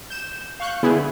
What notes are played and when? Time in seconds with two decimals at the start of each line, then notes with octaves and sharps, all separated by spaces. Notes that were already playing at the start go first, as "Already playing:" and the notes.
0.10 G6 E7
0.60 F5 C#6 F#6 G6
0.83 D3 B3 E4 G#4